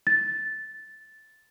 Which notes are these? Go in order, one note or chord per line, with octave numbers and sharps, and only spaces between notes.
A6